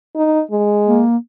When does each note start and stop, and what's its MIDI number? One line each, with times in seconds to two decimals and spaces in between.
0.16 0.41 63
0.51 1.01 56
0.88 1.17 58